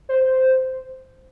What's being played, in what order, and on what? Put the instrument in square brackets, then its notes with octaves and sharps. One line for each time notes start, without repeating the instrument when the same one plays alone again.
[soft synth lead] C5